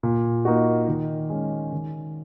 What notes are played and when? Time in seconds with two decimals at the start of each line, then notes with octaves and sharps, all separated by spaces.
0.03 A#2
0.45 A#3 D#4 F#4
0.88 D#3
1.29 G#3 C#4
1.72 D#3